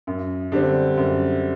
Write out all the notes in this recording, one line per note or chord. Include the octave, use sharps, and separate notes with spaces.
F#2
D3 G3 C4
F#2